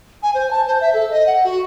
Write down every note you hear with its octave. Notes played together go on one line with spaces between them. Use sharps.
G#5
C5
A5
C5
E5
A4
D#5
F#5
F#4